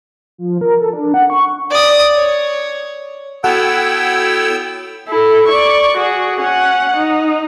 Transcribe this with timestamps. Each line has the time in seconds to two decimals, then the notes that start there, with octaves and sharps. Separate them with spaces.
0.38 F3
0.61 A#4
0.80 A4
0.93 D4
1.14 F#5
1.30 C#6
1.70 D5 D#6
2.16 C#5
3.44 B3 E4 F#4 A4 C#5 F#5 G5 E6
5.08 E4 A4
5.48 D5 C#6
5.97 F#4 G#4
6.40 C#4 F#5
6.96 D#4